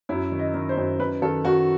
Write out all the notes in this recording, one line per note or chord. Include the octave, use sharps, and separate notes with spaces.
F#2 E4
D#3
D#5
D#3
C5
F#2
F#2 B4
D#3 A4
D#3 F#4